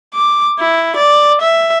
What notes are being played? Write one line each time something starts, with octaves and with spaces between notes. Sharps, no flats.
D6
E4
D5
E5